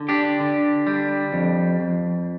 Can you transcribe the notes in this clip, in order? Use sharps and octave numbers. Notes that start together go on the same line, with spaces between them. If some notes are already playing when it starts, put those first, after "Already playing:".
Already playing: D3
D4 G4
D3
G3
F2
F2